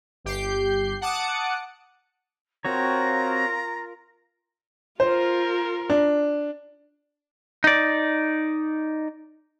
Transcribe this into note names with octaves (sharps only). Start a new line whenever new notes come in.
G1 G4 G6 C7
F#5 A5 D6 D#6 F#6 C#7
C4 F4 F#4 A#4 C#5 A#5
F4 A#4 C5
D4
D#4 D5